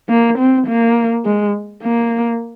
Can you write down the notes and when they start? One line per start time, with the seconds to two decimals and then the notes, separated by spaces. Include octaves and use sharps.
0.09 A#3
0.38 C4
0.67 A#3
1.25 G#3
1.83 A#3